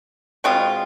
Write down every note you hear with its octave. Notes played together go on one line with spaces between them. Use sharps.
B2 G#3 C4 F4